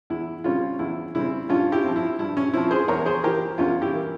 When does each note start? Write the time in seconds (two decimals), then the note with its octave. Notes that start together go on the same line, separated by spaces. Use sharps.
0.10 E2 E4
0.44 C#3 G3 C4 C#4 F4
0.79 E2 E4
1.15 C#3 G3 C4 E4
1.49 G2 C#4 F4
1.72 E4 G4
1.84 F3 C4
1.96 E4
2.19 G2 E4
2.37 C#4
2.53 F3 C4 E4
2.71 G#4 C5
2.88 E2 A#4 C#5
3.06 G#4 C5
3.23 E3 A#3 G4 A#4
3.58 E2 C#4 F4
3.82 E4 G4
3.93 E3 A#3